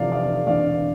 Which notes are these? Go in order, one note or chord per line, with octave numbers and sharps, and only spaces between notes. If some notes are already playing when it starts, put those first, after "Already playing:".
Already playing: F1 F2 C3 E3 D5 F5
D5 F5
E1 E2 D3 D5 F5